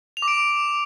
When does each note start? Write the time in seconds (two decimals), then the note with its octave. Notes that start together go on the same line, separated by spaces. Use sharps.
0.17 F7
0.22 D6
0.28 D7